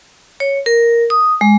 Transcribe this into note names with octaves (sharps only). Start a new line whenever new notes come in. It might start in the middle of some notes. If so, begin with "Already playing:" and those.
C#5
A#4
D#6
G#3